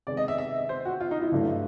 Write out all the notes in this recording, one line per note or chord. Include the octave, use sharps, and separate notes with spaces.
C3 D#3 G#3 B3 D5
D#5
E5
E5
C5
F#4
F4
D#4
E4
G2 D3 F#3 A3 D4